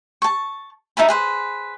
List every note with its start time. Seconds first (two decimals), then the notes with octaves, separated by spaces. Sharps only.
0.22 A5 C#6
0.97 D#4 E5 A5 B5
1.08 G#4 B4 C5